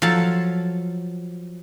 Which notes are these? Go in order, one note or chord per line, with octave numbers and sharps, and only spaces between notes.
F3 F#3 A4 A5